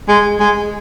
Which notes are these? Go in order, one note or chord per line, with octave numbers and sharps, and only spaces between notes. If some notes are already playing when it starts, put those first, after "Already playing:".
G#3
G#3